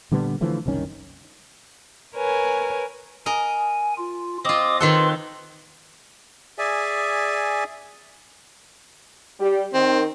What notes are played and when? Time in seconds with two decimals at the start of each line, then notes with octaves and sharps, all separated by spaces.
0.12 A#2 D3 G3 B3
0.41 D3 E3 F3 A3
0.66 F#1 C2 D#3 C#4
2.15 A#4 B4 C#5 G#5
3.26 A#4 D#5 G#5
3.97 F4
4.45 C4 F4 D#5 D6 D#6
4.80 D#3 F4 A4 B4 C6
6.58 G#4 D5 E5 G#5
9.40 G3 G4
9.74 D#3 C4